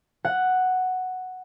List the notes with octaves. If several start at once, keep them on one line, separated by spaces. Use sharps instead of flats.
F#5